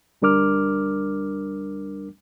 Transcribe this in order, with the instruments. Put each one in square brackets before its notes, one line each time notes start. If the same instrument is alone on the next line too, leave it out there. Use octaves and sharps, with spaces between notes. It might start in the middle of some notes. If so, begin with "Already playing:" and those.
[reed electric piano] D2 G3 D4 A#4 D6 F6